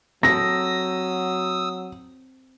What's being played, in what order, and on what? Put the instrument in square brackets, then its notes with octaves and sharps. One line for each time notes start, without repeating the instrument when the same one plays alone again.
[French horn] F#3 [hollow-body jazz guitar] C4 G4 A4 [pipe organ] D#6 E6 [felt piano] A#6